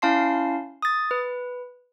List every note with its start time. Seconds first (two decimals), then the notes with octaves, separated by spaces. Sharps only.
0.02 C#4 E4 F5 A5 C6 C7
0.82 D#6 A6
1.11 B4